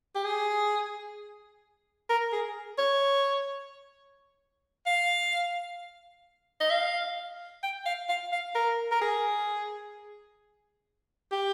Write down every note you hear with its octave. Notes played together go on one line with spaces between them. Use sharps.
G4
G#4
A#4
G#4
C#5
F5
D#5
F5
G5
F5
F5
F5
A#4
A#4
G#4
G4